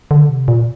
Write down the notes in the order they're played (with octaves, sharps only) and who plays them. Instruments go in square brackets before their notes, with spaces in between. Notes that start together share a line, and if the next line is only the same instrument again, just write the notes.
[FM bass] D3
C3
A#2